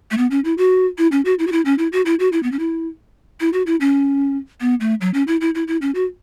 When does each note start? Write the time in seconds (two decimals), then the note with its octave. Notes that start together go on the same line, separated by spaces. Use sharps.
0.11 A3
0.18 B3
0.31 C#4
0.45 E4
0.58 F#4
0.98 E4
1.12 C#4
1.25 F#4
1.39 E4
1.47 F#4
1.52 E4
1.65 C#4
1.78 E4
1.92 F#4
2.06 E4
2.19 F#4
2.32 E4
2.43 B3
2.52 C#4
2.59 E4
3.40 E4
3.53 F#4
3.66 E4
3.80 C#4
4.61 B3
4.80 A3
5.01 F#3
5.14 C#4
5.27 E4
5.41 E4
5.55 E4
5.68 E4
5.82 C#4
5.95 F#4